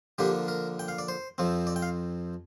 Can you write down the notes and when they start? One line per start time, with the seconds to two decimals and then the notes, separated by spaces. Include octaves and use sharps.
0.18 D3 F3 A#3 D4 G4
0.48 A#4
0.79 G5
0.88 F5
0.99 D5
1.08 C5
1.38 F2 F3 C4
1.67 D5
1.76 G5
1.82 F5